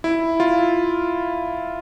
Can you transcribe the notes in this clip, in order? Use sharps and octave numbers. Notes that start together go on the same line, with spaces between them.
E4
F4